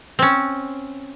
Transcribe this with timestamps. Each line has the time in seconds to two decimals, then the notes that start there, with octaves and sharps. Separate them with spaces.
0.19 C4 C#4